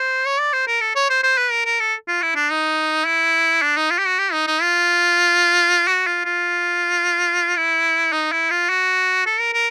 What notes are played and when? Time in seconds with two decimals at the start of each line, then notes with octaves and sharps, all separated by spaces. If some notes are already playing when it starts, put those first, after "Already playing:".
Already playing: C5
0.25 C#5
0.39 D5
0.53 C5
0.67 A#4
0.81 A4
0.95 C#5
1.10 C5
1.23 C5
1.38 B4
1.51 A#4
1.65 A#4
1.80 A4
2.08 F4
2.22 E4
2.35 D4
2.50 D#4
3.06 E4
3.62 D4
3.77 D#4
3.91 F4
3.99 G4
4.05 F#4
4.19 G4
4.33 D#4
4.47 D#4
4.62 F4
5.88 F#4
6.07 F4
6.25 F4
7.56 E4
8.12 D#4
8.32 E4
8.50 F4
8.70 F#4
9.26 A4
9.40 A#4
9.54 A#4